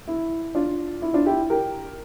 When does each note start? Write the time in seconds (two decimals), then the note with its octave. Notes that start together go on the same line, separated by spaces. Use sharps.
0.08 E4
0.55 D4 F4
1.02 E4
1.14 D4 F4
1.26 E4 G4
1.50 G4 A#4